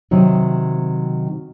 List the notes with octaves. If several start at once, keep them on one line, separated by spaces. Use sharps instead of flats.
C3 D#3 F#3